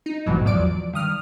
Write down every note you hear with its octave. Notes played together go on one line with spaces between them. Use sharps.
D#4
A1 D2 G#2 B2 E3 F#3
E2 F3 F#3 D5 D7
G2 D#3 D#6 F6